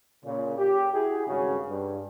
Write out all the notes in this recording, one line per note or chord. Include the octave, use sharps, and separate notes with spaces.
A#2 C#3
G4
E4 F#4 G#4
G#1 G2 C#3 C#4 F#4
G2